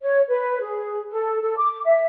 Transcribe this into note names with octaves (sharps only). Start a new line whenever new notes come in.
C#5
B4
G#4
A4
A4
D6
E5